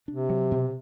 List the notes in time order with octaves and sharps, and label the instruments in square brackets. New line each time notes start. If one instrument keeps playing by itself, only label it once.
[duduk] C3 [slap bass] D4
[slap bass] F#3
B2